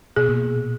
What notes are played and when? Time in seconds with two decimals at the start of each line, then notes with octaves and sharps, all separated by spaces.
0.16 B2 G#4
0.29 A#2